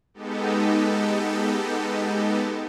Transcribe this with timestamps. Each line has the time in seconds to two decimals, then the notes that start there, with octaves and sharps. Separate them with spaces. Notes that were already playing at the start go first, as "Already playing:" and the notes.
0.14 G#3 B3 D#4 G4 A4